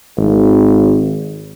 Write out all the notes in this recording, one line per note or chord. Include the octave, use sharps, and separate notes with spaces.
G#1